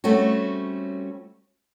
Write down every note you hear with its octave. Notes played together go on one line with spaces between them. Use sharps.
G3 A3 C4 C#4 F#4